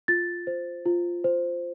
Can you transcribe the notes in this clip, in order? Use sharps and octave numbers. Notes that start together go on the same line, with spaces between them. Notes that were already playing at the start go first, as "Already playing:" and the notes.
F4 A6
C5
F4
C5